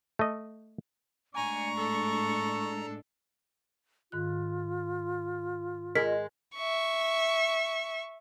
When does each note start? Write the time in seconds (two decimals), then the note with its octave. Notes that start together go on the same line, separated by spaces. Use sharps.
0.19 A3 D#5
1.36 A2 G#3 D4 G#5 A#5 C#6
1.76 A4
4.12 G#2 D#3 F4 F#6
5.95 G#3 A#4 B6
6.56 E5 C#6